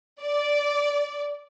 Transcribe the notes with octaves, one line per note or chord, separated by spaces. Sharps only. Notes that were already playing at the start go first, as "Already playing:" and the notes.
D5